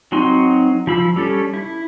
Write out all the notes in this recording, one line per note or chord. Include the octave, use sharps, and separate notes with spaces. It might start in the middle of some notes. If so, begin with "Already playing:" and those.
F#3 C4 D#4 F#4 C6
F3 B5 E6
G3 C#4 A4
E4